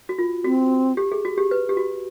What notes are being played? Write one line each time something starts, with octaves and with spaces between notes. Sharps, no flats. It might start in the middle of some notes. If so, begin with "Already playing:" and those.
F#4
F4
C4 F#4
G4
G#4
F#4
G4
B4
G4
F#4